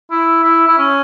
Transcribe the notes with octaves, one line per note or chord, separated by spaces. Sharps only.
E4
E4
E4
C#4